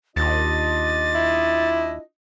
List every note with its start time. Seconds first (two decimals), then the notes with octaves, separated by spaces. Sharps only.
0.16 D#2 D4 F4 D#5 A6
1.14 E4